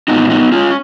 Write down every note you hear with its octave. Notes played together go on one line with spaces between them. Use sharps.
A#2 F3 G#3 B3 D#4
B3 D#4
C#4 F4